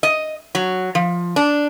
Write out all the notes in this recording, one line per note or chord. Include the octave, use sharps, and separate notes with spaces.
D#5
F#3
F3
D4